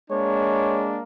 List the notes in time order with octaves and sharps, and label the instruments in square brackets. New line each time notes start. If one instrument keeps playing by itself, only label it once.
[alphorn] G#3 [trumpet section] A#3 D4 [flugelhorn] C#5